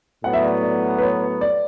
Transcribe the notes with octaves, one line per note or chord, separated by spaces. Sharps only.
A2 F#3 B3 F#5
E5
D5
D5
B4
C#5
D5